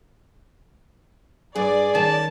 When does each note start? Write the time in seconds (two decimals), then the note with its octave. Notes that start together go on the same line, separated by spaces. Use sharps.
1.56 G2 G#4 D5
1.95 D#3 C#4 A4 A5